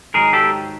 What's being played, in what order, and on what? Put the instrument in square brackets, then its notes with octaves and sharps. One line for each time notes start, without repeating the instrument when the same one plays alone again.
[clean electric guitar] G#2 D#3 F#3 G#4 A#4
G4 A4